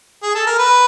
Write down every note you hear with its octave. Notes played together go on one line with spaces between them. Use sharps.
G#4
A4
A#4
B4